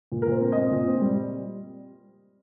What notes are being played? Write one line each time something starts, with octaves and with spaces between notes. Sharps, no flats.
A#2
A#4
A#2 C5
C4
C4 D#5
A#2
C4
G3